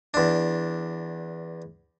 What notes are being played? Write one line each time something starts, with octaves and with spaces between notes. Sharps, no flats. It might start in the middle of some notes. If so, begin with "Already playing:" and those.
E2 D4